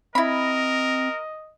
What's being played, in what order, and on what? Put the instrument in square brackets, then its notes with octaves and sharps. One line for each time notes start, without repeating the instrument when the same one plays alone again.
[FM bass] C4 [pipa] E4 B5 [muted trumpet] A#4 [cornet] D#5